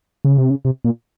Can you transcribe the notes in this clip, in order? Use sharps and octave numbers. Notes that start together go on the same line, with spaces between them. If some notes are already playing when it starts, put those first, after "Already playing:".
C#3
C3
C#3
C3
A#2